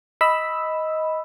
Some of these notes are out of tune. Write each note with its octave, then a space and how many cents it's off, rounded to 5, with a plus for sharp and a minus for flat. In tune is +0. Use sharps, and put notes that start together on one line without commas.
D#5 +15 B5 +0 E6 +0